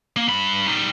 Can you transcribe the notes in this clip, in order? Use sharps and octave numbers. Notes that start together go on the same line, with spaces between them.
A#3
G2 B5
G3 D#4